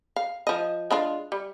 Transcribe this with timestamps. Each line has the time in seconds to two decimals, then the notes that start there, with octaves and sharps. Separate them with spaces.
0.16 F5
0.47 F3 D#5
0.91 G#3 D4 F4
1.32 G3